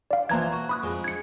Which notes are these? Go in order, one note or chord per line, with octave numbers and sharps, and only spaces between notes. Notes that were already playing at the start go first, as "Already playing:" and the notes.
D5 F5
E3 F3 A#3 F4 A#5 G#6
F#4
B5 D#6 F#6
F2 G#3
G#6 C#7